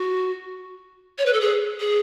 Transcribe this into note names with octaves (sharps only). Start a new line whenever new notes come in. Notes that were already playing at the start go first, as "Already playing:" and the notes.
Already playing: F#4
C#5
B4
A4
G#4
G#4